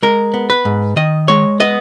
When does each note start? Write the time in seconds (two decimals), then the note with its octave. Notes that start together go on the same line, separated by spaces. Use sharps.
0.03 G#3 A#4
0.34 B3
0.50 B4
0.65 G#2
0.96 D#3 D#5
1.28 G#3 C#5
1.60 B3 D#5